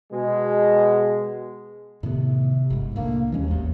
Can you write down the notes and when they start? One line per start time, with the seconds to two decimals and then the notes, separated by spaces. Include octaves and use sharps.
0.11 B2 G#3
2.03 A2 C3 D#3 B3
2.70 G1 G#2
2.96 C2 A2 D3 A#3
3.32 D#2 E3 G#3 C#4
3.48 G#1 E2